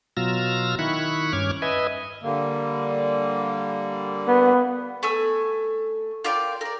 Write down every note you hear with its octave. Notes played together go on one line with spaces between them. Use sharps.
B2 F#3 F4 E6 F6 A#6
D#3 E4 B5 C#6 F#6
G2 C#4 D6 F6 G#6
B4 D#5 E5 G#5
D3 G3 A#3
B3
A3 G#5 E6
F4 A#4 D5 G5
A#4 D5